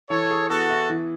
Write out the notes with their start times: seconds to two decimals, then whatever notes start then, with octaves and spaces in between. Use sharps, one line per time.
0.10 E3 A4 C#5
0.30 G#4
0.50 B3 F#4 A4
0.70 E4
0.89 E3